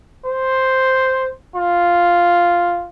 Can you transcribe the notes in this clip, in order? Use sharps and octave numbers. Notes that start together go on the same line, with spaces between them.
C5
F4